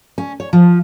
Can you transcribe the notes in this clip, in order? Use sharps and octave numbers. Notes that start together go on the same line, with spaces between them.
C#4
C#5
F3